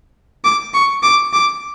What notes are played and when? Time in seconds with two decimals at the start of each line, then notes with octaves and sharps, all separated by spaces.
0.44 D6
0.74 C#6
1.03 D6
1.33 D6